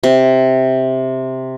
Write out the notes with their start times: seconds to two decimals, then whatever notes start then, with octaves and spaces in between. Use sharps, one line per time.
0.03 C3